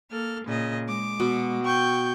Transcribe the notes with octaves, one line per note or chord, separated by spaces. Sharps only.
A#3 A4 F6
A#2 C#3 D#5
G#3 D6
B2
G5 C#6 G6